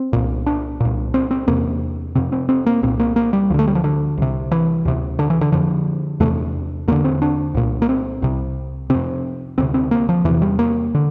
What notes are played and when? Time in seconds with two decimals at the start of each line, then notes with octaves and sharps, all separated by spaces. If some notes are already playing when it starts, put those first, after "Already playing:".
Already playing: C4
0.13 C2 A#2
0.46 D4
0.80 C2 A#2
1.14 C4
1.31 C4
1.48 E2 C3 A#3
2.15 F2 C3 C4
2.32 C4
2.49 C4
2.66 A#3
2.83 C2 A#2 C4
3.00 A#3
3.16 A#3
3.33 G3
3.50 D2 F3
3.54 D3 A3
3.68 G3
3.75 F3
3.84 D3
4.18 C2 C3
4.51 E3
4.85 D2 C3
5.19 D3
5.30 E3
5.41 D3
5.52 F2 D3 F3
6.20 E2 C3 A3
6.88 E2 D3 A#3
7.04 C4
7.22 D4
7.55 C2 A#2
7.82 A#3
7.89 C4
8.22 C2 C3
8.90 F2 C3 C4
9.58 D2 C3 C4
9.74 C4
9.91 A#3
10.09 F3
10.25 E2 C3 E3
10.42 G3
10.59 A#3
10.94 D3